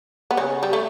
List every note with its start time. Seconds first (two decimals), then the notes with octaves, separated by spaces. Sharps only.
0.31 B3
0.37 C#3 C#4
0.63 G3
0.73 A3